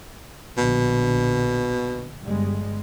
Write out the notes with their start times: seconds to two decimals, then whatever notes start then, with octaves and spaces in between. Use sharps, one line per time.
0.57 A#1 B2 D3
2.23 G1 G3 G#3